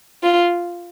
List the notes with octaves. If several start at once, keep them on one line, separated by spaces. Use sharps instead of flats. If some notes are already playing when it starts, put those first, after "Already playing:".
F4